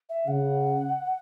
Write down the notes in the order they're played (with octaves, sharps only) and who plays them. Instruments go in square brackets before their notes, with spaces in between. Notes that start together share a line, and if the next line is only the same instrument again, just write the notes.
[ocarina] E5
[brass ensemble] C#3 [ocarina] F#5